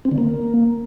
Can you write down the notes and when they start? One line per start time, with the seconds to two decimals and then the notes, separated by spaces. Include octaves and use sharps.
0.05 C4
0.11 D3
0.18 A#3